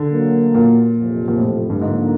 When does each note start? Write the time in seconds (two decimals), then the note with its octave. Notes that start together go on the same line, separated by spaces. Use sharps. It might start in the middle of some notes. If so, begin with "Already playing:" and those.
Already playing: D3
0.12 B2 F#3 A#3
0.55 A#2
0.96 F#1 F2 C3 F3
1.28 A#2
1.39 A2
1.70 G2
1.81 G#2 D3 F3 A#3 D#4